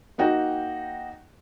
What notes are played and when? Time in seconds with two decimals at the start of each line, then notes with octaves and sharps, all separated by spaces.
0.18 A#3 D#4 F#4 G5